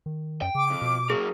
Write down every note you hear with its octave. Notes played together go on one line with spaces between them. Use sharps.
D#3
F#2 G5
C#3 D6
F2
B2
F#3 A#3 G#4